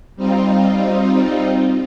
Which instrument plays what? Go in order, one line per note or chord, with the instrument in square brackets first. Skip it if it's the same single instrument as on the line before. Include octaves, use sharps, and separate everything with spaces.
[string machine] G3 C4 D#4 F4